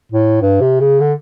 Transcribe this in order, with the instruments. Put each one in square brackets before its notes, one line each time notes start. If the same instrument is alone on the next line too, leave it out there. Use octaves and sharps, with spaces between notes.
[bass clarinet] A2
G2
C3
C#3
D3